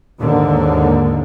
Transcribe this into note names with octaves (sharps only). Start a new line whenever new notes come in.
D#2 G#2 D3